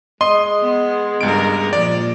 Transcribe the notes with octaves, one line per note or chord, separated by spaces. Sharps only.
G#3 D#5 C6
B3
C#2 G2 A#4 D7
A#2 F3 D5